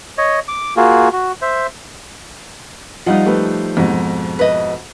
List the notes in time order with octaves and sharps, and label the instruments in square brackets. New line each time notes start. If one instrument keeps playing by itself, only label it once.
[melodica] C#5 D#5
D6
A#3 F4 F#4 G#4
F#4
C5 E5
[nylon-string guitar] F3 G3 D#4 [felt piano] F4 D#5 F#5
[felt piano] A3 G4 B4
F2 G#2 B2
[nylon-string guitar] B4 D#5